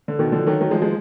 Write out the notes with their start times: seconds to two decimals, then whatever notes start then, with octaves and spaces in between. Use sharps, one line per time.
0.08 D3
0.19 B2 D#3
0.32 D3 F3
0.47 D#3 F#3
0.61 D#3 F#3
0.71 F3 G#3
0.82 F3 G#3